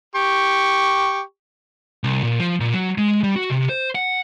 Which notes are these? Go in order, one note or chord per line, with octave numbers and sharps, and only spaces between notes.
G4 C#6
C2
A#2
F3
A#2
F#3
G#3
G3
F#4
C3
C5
F#5